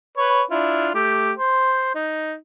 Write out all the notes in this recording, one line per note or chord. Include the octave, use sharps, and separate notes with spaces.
B4 C#5
D4 E4 F4
A3 G4
C5
D#4